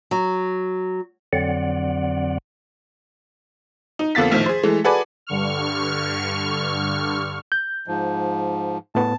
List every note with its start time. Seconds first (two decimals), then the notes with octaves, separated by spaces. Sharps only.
0.11 F#3
1.33 F2 D3 F#3 C4 D5 F#5
3.99 D#4
4.15 F2 D3 A#3 B3 A6 B6
4.31 A#1 A2 D#3 F3
4.46 G#4 C5
4.63 E3 G#3 A3
4.84 F#4 G#4 A4 B4 D5 G#5
5.27 G2 D3 C#6 F6
7.52 G6
7.88 G#2 F3
8.95 A2 B3 A5